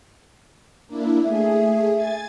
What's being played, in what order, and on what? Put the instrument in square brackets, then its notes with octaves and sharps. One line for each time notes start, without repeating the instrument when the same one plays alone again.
[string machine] A#3 D4 E4
[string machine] A3 G#4 [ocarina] E5
[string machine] G#5 G#6 A6